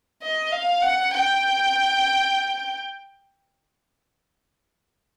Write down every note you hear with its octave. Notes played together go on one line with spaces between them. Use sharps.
D#5
F5
F#5
G5